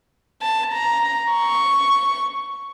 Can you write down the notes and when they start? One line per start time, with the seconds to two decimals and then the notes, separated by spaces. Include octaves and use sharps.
0.42 A5
0.72 A#5
1.33 C#6